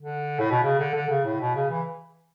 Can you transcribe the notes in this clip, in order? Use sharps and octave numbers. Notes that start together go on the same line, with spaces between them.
D3
A2
B2
C#3
D3
D3
C#3
A2
B2
C#3
E3